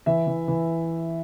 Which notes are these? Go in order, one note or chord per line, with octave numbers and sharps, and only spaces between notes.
E3 E5
E3
E3